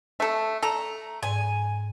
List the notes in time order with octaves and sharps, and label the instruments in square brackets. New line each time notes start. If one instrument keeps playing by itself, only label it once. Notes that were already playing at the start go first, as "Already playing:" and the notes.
[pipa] A3 A4
[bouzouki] A3 A#5 [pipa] A4
[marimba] G#2 [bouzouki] G#5